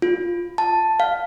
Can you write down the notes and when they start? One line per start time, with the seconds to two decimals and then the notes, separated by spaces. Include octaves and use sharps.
0.02 F4
0.58 A5
1.00 F5